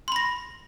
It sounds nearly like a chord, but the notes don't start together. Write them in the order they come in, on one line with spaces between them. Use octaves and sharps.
C6 B5 A#6